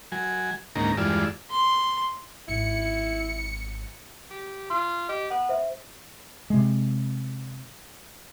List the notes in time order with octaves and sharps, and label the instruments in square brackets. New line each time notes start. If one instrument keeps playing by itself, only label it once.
[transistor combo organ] F#3 G#5
D2 G#2 A#3 C#4 D#4 A#5
E2 G2 G#3 F4 D5 E6
[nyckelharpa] C6
[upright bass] G#1 [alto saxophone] E4 [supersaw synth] C#7
[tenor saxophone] G4
[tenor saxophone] F4 [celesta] C6
[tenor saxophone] G4 [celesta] D#5
[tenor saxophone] B3 [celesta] F#5
[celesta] C5 E5
[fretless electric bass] C3 G#3